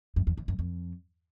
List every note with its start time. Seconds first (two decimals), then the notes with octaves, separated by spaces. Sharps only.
0.16 F#2
0.27 E2
0.38 E2
0.48 F#2
0.59 F2